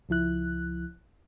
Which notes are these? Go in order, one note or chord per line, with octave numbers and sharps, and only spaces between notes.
C#2 F3 E4 F#6